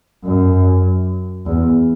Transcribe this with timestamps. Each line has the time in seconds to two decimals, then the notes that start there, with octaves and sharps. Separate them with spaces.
0.24 F#2
1.46 E2